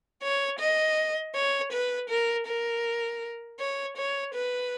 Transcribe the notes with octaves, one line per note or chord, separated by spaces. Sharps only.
C#5
D#5
C#5
B4
A#4
A#4
C#5
C#5
B4